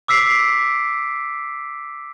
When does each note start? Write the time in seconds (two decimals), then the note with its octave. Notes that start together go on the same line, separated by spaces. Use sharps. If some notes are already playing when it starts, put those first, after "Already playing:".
0.08 D6 E6 B6 C7 D7